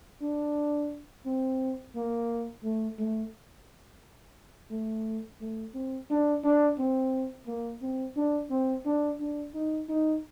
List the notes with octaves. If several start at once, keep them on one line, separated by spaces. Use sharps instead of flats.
D4
C4
A#3
A3
A3
A3
A3
C4
D4
D4
C4
A#3
C4
D4
C4
D4
D4
D#4
D#4